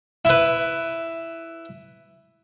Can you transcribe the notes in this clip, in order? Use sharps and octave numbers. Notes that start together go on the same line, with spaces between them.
E4 B4